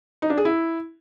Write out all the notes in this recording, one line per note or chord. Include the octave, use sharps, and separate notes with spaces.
D#4
D4
G#4
E4